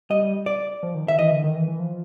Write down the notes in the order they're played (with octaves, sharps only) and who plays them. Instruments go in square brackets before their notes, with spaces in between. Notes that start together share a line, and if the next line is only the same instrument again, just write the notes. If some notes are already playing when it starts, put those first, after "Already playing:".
[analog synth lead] G3 [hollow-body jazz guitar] D#5
[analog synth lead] G3
[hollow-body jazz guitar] D5
[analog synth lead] F3
D#3
[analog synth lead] D#3 [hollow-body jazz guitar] E5
[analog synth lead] E3 [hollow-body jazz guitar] D#5
[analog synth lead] D3
D#3
E3
E3
F3